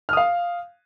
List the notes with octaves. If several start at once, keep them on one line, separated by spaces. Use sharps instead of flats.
F5 D#6 F6